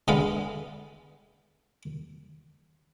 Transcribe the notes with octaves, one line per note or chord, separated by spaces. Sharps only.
D3 G#3 B3 F5